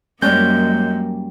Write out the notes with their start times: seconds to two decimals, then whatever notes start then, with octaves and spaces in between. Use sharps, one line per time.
0.22 F#2 G3 G#3 A#3 C#4 G6